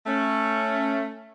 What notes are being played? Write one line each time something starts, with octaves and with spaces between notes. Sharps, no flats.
A3 C#4